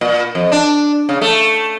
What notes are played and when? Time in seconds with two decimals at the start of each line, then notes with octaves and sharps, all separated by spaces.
0.01 A#2
0.35 F2
0.52 D4
1.09 C#3
1.21 A3